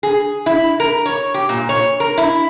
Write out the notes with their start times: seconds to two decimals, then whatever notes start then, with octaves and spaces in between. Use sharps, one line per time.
0.03 G#4
0.46 E4
0.80 A#4
1.06 C#5
1.34 G4
1.49 A#2
1.69 C#5
2.00 A#4
2.18 E4